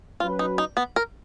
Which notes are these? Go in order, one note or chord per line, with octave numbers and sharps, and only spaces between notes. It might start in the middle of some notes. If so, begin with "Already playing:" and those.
F#3 C#4 F4 F#4 B4
D#4
D#4
B3
A#4